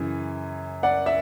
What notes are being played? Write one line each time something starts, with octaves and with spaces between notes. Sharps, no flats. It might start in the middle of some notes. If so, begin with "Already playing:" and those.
Already playing: F#2 C#3 E3
D5 F#5
E5